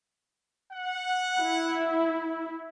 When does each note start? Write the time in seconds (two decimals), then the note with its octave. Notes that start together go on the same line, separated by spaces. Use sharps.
0.72 F#5
1.41 E4